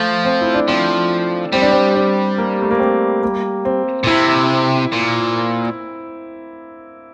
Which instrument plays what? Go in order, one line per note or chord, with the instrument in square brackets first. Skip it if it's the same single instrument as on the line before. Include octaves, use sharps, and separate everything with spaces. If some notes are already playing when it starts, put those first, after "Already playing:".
Already playing: [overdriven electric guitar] F3 [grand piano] A3
[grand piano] C4
E4
D4
[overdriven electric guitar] F3 [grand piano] C4
[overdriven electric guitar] G3 [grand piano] C4
[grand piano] D4
C4
D4
A#3
A3
A#3
C4
A#3
C4
[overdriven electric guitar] A#2
[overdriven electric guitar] C3 [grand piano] E4
[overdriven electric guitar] A#2